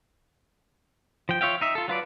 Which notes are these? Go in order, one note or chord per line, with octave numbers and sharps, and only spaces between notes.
F3 G5
F4 C#5 E5 F5 G5
D#4 E5
F4 A4
F#3 F4 B4 D5